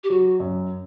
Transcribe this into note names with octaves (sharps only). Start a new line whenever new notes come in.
G4
F#3 F#4
F#2